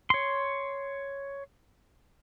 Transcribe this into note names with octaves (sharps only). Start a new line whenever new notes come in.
C#5 C6